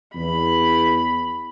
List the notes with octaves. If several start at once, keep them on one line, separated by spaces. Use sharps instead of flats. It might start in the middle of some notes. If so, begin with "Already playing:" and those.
E2 B5